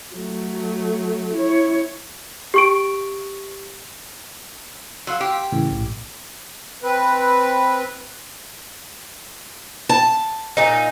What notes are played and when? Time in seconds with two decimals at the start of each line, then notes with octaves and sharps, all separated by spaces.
0.15 F#3 A3
1.34 E4 C#5
2.54 G4 C#6 D7
5.07 F#3 F5 C6 E6
5.21 G4
5.52 A2 C#3 E3
5.71 A#1 A2
6.83 C4 B4
9.89 A5
10.57 A#2 D#4